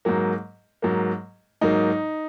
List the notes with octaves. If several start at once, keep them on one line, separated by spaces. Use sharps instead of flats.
G#2 F#3 A#3
G#2 F#3 A#3
G#2 F#3 A#3 D#4